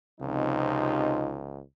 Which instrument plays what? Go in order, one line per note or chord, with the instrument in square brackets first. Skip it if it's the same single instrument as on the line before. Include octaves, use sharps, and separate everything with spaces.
[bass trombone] C#2 [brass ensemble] C3 F3 D#4